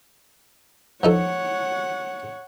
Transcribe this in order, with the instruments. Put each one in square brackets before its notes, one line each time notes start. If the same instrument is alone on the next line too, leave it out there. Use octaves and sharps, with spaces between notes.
[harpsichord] F3 D#4 A4 [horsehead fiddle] C#5 F#5